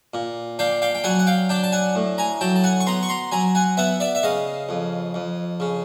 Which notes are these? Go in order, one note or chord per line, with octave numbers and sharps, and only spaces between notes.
A#2
D4 F5 G5
F5 G5
G5
F#3 F#5 G#5
F#5
F5 G5
D4 G5 A5
A5
F#5 G#5
A2
G#5 A#5
F#3 G5 A5
A5
F#5 G#5
C#6
B3 A#5 C6
C#6
A#5 C6
F#3 G#5 A#5
F#5 G#5
B3 E5 F#5
D5 E5
E5
C#3 D#5 F5
F2
F2
C#3